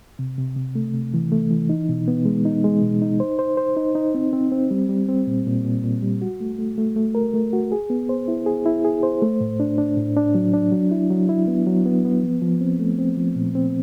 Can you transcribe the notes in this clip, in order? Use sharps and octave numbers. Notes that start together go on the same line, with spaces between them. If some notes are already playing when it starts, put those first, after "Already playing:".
C3
C3
C3
A3
C3
E3
A3
E3
D#4
B2
B3
G#3
D#4
G#3
B2
D#4
C5
C5
C5
D#4
D#4
C4
C4
C4
G3
G3
C4
A#2
A#2
A#2
A#2
G3
F#4
A3
A3
A3
A3
A#4
A3
F#4
G#4
B3
C5
E4
G#4
E4
G#4
C5
A3
A2
D4
D4
A2
D4
F#3
D4
F#3
E4
F#3
E4
B3
F#3
B3
B3
F3
F3
C4
A3
C4
F3
A#2
C4